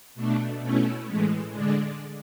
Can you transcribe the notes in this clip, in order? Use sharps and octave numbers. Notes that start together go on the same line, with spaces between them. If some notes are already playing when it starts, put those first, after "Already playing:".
B2 A3 D4
B2 A3 C#4 E4
A2 E3 G#3
D3 G#3 D4